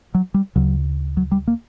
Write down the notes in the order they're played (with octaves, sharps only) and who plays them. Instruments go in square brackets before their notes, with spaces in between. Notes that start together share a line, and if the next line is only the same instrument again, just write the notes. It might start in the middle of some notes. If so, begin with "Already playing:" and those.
[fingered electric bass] F#3
G3
D2 C#3 F#3
F#3
G3
A#3